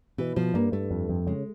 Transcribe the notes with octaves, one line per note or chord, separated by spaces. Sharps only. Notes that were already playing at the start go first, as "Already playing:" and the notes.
B2 E3
B2 F3
G2 A#3
G2 A3
F2
F2
C#3 G#3